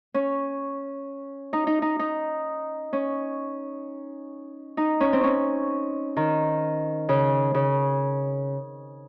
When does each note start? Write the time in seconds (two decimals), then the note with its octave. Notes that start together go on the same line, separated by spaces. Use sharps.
0.14 C#4
1.53 D#4
1.67 D#4
1.82 D#4
1.99 D#4
2.93 C#4
4.77 D#4
5.00 C#4
5.13 C4
5.23 C#4
6.17 D#3
7.09 C#3
7.54 C#3